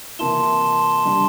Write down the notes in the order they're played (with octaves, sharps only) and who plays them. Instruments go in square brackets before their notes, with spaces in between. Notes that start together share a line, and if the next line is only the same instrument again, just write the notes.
[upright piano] C3 E3 A#3 E4 [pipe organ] A5 C6
[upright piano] C3 G3 D4